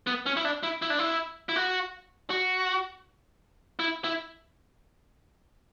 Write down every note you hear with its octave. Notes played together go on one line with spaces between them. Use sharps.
B3
C#4
E4
D4
E4
E4
D4
E4
E4
F#4
F#4
E4
E4